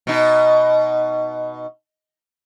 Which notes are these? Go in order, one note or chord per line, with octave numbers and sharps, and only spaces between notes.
B2 D#4